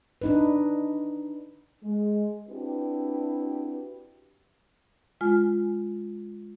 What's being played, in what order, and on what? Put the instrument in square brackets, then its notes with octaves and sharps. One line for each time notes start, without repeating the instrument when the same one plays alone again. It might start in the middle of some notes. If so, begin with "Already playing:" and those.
[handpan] D4 D#4 B4
[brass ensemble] G#3
C4 D4 E4 F#4 G4 B4
[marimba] G#3 F4 G#5 F6